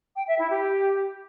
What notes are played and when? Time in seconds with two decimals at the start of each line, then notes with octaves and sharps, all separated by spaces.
0.16 G5
0.28 E5
0.39 E4
0.51 G4